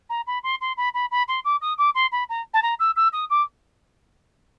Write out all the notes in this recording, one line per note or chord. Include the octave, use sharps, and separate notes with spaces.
A#5
B5
C6
C6
B5
B5
B5
C6
D6
D#6
D6
C6
B5
A#5
A5
A#5
E6
E6
D#6
D6